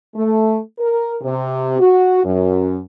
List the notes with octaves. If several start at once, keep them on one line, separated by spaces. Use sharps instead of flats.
A3
A#4
C3
F#4
F#2